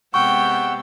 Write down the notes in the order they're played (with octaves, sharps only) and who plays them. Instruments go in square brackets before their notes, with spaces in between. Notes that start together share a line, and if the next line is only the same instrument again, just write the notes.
[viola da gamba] C3 G#3 B3 [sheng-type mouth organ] F#5 E6 [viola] G5 [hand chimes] C#6